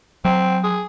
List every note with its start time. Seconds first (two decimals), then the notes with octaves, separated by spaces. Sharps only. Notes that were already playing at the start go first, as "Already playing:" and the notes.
0.25 F#3 C4
0.64 G#4